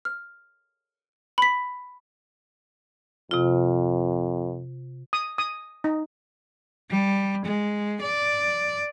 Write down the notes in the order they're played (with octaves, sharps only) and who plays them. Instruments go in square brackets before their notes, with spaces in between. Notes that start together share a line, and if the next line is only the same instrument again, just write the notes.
[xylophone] F6
B5 B6
[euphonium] F2 [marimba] C3 F4
[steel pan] D#6
D#6
D#4
[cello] G3
G#3
D5